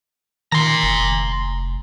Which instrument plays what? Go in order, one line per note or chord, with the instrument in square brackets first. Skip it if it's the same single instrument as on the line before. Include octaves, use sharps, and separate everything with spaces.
[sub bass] D#3 [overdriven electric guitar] A#5 C6
[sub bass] F1